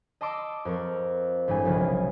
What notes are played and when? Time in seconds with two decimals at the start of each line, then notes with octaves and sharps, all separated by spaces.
0.21 D#5 A5 C6 D6 E6
0.65 F2 A#4 C#6
1.48 A1 G2 G3 G#3 G#5
1.65 F#1 B1 C3 F3